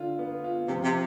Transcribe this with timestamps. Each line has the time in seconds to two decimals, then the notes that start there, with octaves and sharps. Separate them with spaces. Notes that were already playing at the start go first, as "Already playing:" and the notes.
Already playing: D3 F4
0.19 B3
0.44 F4
0.68 C3 F3
0.84 C3